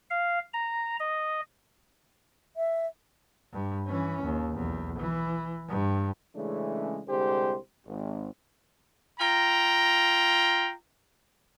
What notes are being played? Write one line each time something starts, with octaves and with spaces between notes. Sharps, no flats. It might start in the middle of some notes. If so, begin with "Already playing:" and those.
F5
A#5
D#5
E5
G2
E3 C#4
D#2
B1 E2
E3
G2
C#3 E3 G#3 A3 C#4 D4
C2 D3 G#3 G4 C5
G#1
F4 G5 A#5